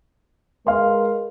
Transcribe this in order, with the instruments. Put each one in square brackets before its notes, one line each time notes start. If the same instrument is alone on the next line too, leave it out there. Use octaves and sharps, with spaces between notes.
[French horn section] G#3 A#4 B4 [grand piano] F5 C6